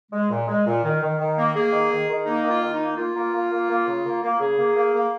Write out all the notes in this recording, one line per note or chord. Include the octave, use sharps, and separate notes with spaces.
G#3
A#2
G#3
A#2
D#3
D#3
D#3
A#3
A#3 G#4
D#3
D#3
D#3
A#3 D#4
D#3
F4
D#3
D#4
A#3
A#3 F4
A#3
A#3
A#3
A#3
C#3
A#3
A#3
C#3 G#4
A#3
A#3
A#3